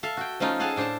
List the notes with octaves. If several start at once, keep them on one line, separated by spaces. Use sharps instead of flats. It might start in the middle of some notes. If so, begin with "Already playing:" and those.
A4 E5 F5
F#4 G5
F3 A3 C#4 D#4 F4 F5
G#4 A4 F5 F#5 G#5 A5
A2 D4 C5 F5 A5